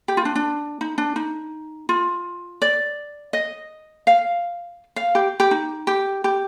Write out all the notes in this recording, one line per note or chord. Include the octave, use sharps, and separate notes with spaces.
G4
F4
D4
D4
D#4
D4
D#4
F4
D5
D#5
F5
F5
G4
G4
D#4
G4
G4